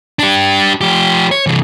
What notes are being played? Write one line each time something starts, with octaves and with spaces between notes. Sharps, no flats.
D4 G4
F3 G4
C#5
C3 E3